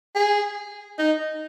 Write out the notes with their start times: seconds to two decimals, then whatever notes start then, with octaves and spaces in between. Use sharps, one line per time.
0.16 G#4
0.99 D#4